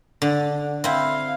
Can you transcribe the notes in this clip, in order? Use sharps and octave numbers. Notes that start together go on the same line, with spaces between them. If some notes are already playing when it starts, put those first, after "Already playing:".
D3
C4 E4 F5